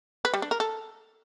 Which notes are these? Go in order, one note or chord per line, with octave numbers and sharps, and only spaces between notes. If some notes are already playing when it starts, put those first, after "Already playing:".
B4
G3
D4
A#4
A4